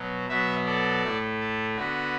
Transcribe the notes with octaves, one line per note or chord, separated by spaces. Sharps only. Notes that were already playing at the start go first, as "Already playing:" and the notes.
Already playing: B2 F#3
B2 F#3 B3 B4 E5
A4 D5
A2 A3
A4
D3 B3 F#4 B4